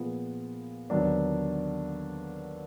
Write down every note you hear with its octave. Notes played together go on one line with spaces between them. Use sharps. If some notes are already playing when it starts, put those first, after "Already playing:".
Already playing: A#2 F3 B3 F4 G#4
D#2 D3 F#3 B3 D4